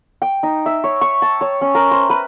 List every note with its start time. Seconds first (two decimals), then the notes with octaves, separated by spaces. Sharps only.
0.22 G5
0.43 D#4
0.66 E5
0.84 C#5
1.01 C#6
1.22 A5
1.41 C#5
1.61 C#4
1.75 A#4
1.91 C5
2.10 B4